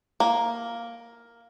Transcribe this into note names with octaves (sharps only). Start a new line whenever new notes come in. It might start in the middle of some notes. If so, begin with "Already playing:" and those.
A#3